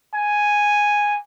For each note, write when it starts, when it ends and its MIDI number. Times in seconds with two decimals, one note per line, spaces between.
0.14 1.17 80